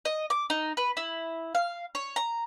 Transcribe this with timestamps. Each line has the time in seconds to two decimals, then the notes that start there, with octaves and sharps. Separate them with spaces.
0.05 D#5
0.30 D6
0.50 D#4
0.77 B4
0.97 E4
1.55 F5
1.95 C#5
2.16 A#5